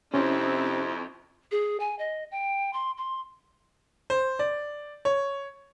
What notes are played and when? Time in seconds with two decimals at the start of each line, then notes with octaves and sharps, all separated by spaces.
0.14 F2 C3 C4 C#4 D#4 E4
1.52 G#4
1.80 G#5
1.99 D#5
2.31 G5
2.73 C6
2.98 C6
4.10 C5
4.39 D5
5.05 C#5